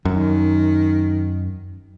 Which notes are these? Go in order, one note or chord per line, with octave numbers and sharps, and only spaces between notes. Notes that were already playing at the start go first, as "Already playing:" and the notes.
F#2 D#3